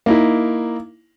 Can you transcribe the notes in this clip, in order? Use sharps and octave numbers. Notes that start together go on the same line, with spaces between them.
A#3 D#4 E4